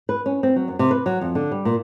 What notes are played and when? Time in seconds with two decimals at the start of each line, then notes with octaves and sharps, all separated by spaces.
0.09 B4
0.26 C#4
0.43 C4
0.56 F#3
0.68 F#2
0.79 C3
0.91 B4
1.06 F#3
1.21 F2
1.35 D3
1.51 G3
1.65 A#2